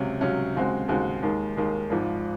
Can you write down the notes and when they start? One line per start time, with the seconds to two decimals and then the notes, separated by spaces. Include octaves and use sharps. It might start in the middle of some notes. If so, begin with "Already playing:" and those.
Already playing: C#2 C3 F#3 C#4
0.21 C#2 C3 F#3 C#4
0.55 D#2 C#3 G#3 C4 F#4
0.88 D#2 C#3 G#3 C4 F#4
1.22 D#2 D#3 G#3
1.57 D#2 D#3 G#3
1.90 G#1 G#2 F3